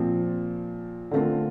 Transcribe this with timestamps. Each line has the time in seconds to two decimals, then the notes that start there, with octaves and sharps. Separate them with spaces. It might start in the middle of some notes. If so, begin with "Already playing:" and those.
Already playing: A#2 F3 C4
1.11 D3 A3 C4 F4 A#4